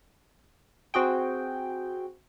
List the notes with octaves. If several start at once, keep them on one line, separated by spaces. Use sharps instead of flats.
C4 F#4 G#4 G5